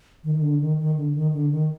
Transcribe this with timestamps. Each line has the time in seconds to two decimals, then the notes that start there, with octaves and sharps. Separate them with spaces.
0.24 D#3
0.35 D#3
0.42 D3
0.61 D#3
0.79 D#3
0.97 D3
1.15 D#3
1.33 D3
1.51 D#3